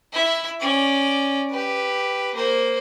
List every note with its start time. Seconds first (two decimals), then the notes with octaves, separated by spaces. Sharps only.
0.13 E4 E5
0.61 C#4 D5
1.51 G4 B4
2.35 A#3 C5